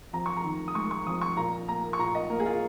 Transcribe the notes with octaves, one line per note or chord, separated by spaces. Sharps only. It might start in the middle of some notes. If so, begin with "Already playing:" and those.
F2 A#5
C#6
A#5
D#3
D#6
G#3 C#6
C#6
F2 D#6
C#6
A#2 A#5
A#3 A#5
C#6
A#2 A#5
D#5
A#3 A#4
G#4
F4